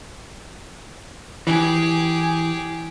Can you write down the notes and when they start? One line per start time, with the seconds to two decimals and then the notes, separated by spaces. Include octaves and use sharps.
1.47 E3 G4 G#4